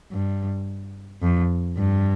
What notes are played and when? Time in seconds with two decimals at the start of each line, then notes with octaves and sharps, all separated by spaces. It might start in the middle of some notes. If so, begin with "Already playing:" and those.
0.12 G2
1.22 F2
1.77 G2